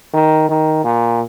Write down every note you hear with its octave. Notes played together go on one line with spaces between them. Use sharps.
D#3
D#3
A#2